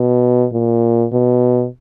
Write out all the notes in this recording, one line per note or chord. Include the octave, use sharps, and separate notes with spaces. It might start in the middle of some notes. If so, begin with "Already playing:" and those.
Already playing: B2
A#2
B2